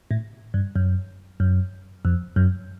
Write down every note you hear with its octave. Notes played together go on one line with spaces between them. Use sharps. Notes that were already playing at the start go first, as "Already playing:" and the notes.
A2
G2
F#2
F#2
F2
F#2